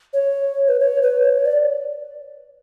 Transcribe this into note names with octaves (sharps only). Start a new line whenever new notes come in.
C#5
B4
C#5
B4
C#5
D5